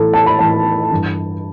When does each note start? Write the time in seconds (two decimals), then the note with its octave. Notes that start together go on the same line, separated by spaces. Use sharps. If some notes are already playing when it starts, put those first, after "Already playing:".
Already playing: A2 E3 A4
0.14 A5
0.26 B5
0.39 A2 E3 A5
0.91 G2 E3